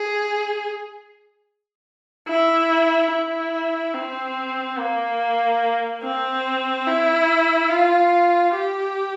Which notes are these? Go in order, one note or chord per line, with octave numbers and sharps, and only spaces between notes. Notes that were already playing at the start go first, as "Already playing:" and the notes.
Already playing: G#4
E4
E4
C4
A#3
C4
E4
F4
G4